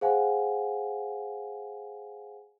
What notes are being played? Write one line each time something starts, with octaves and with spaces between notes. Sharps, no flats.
G#4 C5 F5 F#5 G#5